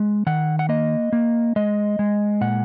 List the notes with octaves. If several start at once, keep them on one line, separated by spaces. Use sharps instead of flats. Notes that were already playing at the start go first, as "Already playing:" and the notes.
Already playing: G#3
D#3 F#5
F#5
A#3 D#5
A#3
G#3 D#5
G#3
A#2 F#5